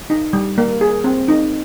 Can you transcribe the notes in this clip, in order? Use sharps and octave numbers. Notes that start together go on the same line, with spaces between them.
D#4
G3
A#3
G#4
C4
D#4